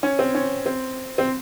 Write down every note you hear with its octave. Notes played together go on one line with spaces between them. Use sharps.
C#4
C4
C#4
C4
C4